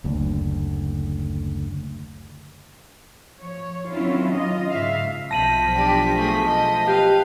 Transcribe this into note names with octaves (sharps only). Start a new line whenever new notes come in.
F#1 D2
F3 C#5
D#3 F#3 C4 C#4 E4 F4
F4 D#5
G#2 C#3 E5 F5
B1 F3 A5 A#6 B6 D#7 F#7
D4 G4
A3 G#4
D#5 A5
G4 B4 F5